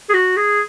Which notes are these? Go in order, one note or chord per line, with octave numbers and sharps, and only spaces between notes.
G#4
F#4
G#4